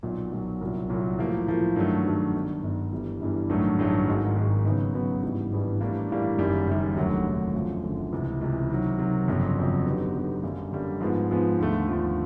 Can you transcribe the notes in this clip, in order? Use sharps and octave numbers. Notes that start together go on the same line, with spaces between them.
B1 A#2 F#3
B1 A#2 F#3
C2 A#2 F#3
C2 A#2 F#3
A2 F3 A#3
A2 F3 A#3
G2 D#3 F#3 A3
G2 D#3 F#3 A3
G1 G2 D#3
G1 G2 D#3
G1 G2 E3 G3
G1 G2 E3 G3
A1 G2 D#3 F#3 A3
A1 G2 D#3 F#3 A3
G#1 G#2 D#3 G#3
G#1 G#2 D#3 G#3
C#3 F#3 B3 D#4
C#3 F#3 B3 D#4
G#1 G2 E3 G3 B3
G#1 G2 E3 G3 B3
A2 E3 G3 A#3 D4
A2 E3 G3 A#3 D4
F#1 F#2 D#3 G3
F#1 F#2 D#3 G3
F1 D#2 D3 F#3
F1 D#2 D3 F#3
F#1 F#2 D3 F3
F#1 F#2 D3 F3
C#2 C3 E3
C#2 C3 E3
C3 D#3 F#3
C3 D#3 F#3
G1 F2 C#3 F#3
G1 F2 C#3 F#3
D3 F#3 B3 D#4 G4
D3 F#3 B3 D#4 G4
F#2 D3 G3 A#3
F#2 D3 G3 A#3
G#2 F3 G#3 B3
G#2 F3 G#3 B3
D#2 D3 F3 A3
D#2 D3 F3 A3